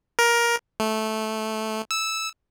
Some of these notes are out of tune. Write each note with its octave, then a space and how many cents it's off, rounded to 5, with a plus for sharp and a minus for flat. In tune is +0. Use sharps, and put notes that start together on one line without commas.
A#4 +15
A3 -10
E6 -10